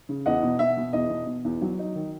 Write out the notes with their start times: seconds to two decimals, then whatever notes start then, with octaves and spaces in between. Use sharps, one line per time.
0.09 C#3
0.26 E2 D#5 F#5
0.43 B2
0.59 B2 E5
0.77 B2
0.93 E2 D#5
1.10 B2
1.27 B2
1.45 E2
1.61 F#3
1.79 D#4
1.95 D#3